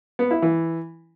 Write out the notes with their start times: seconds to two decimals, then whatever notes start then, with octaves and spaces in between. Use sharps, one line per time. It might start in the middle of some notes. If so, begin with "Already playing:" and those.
0.19 B3
0.31 E4
0.42 E3